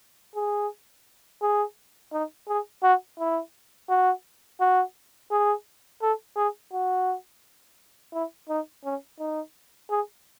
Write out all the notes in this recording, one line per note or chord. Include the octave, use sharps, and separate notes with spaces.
G#4
G#4
D#4
G#4
F#4
E4
F#4
F#4
G#4
A4
G#4
F#4
E4
D#4
C#4
D#4
G#4